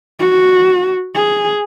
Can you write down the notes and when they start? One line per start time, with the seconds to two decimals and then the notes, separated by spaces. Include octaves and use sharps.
0.19 F#4
1.15 G#4